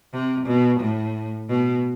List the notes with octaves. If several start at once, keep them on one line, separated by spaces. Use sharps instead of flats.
C3
B2
A2
B2